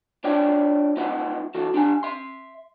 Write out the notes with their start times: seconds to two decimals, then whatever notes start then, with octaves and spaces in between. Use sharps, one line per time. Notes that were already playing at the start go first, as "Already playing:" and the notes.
0.24 D4 F4 C#5 D5 E5 G5
0.97 A#3 D#4 F4 B4 E5 F#5
1.54 E3 F#4 A4
1.74 D4 G4 G#5
2.03 E5 C6